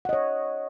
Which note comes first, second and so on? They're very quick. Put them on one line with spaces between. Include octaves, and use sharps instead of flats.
F#5 D#5 C#5